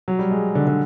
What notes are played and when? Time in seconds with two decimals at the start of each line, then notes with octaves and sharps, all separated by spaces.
0.08 F#3
0.19 G3
0.31 G#3
0.55 D3
0.67 D3